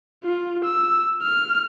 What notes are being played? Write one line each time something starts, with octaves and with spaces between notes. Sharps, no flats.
F4
E6
F6